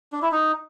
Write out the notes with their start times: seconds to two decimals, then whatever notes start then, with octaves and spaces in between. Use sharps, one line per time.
0.12 D4
0.22 E4
0.32 D#4